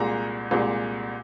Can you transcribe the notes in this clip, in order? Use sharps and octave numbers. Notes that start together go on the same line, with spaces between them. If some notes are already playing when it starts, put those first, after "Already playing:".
Already playing: C2 A#2 G#3 A#5
C2 A#2 G#3